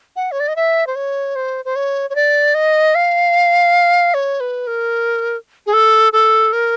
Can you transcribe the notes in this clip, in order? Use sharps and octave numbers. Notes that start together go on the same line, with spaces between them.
F#5
C#5
D5
D#5
E5
C5
C#5
C5
C5
C#5
C#5
D5
D#5
F5
C#5
B4
A#4
G#4
A4
A4
A#4